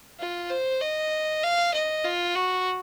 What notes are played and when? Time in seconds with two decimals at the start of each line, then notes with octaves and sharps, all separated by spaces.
0.19 F4
0.50 C5
0.81 D#5
1.43 F5
1.74 D#5
2.04 F4
2.35 F#4